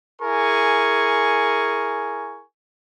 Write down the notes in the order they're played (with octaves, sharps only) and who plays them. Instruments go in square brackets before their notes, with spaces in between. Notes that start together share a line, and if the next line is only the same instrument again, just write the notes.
[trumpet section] E4 G#4 A#4 G#5 C#6